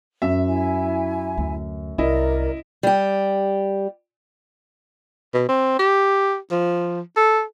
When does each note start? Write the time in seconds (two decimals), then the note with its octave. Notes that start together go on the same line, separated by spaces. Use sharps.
0.22 F#2 E5
0.46 E4 G#5
1.38 D2
1.98 C2 E4 A#4 D5 D#5
2.83 G3 G4
5.34 B2
5.49 C4
5.79 G4
6.51 F3
7.16 A4